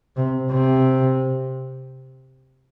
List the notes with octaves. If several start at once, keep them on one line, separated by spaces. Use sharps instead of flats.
C3
C3